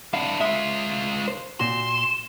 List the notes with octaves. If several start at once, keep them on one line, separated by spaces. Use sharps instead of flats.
D4 E4 F5
G#3 F4 E5
C5
A#2 F#4 C6 E7